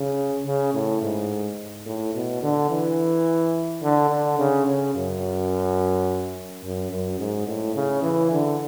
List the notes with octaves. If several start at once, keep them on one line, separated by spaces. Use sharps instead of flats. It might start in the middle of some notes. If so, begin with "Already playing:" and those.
Already playing: C#3
C#3
A2
G#2
A2
B2
D3
E3
D3
D3
C#3
C#3
F#2
F#2
F#2
G#2
A2
C#3
E3
D3